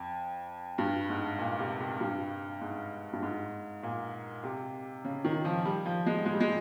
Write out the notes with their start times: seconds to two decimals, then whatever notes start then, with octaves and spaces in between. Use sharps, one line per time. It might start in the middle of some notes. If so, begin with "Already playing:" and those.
Already playing: F2
0.78 G2
1.09 G#2
1.39 A#2
1.59 C3
1.80 C3
2.00 G2
2.61 G#2
3.13 G2
3.22 G#2
3.83 A#2
4.43 C3
5.05 C#3
5.25 D#3
5.45 F3
5.65 G3
5.86 F3
6.06 G#3
6.26 G#3
6.33 G3
6.40 G#3